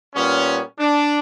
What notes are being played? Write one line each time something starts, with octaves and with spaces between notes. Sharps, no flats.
A#2 G3 B3 C#4
D4